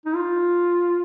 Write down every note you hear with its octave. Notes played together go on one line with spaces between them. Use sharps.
D#4
F4